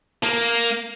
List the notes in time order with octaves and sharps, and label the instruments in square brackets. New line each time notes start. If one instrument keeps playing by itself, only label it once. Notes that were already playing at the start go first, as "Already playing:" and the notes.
[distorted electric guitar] A#3